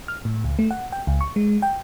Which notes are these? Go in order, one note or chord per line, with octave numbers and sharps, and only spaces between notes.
F6
A2
C#2
A3
F#5
G5
C#2
C#6
G#3
G5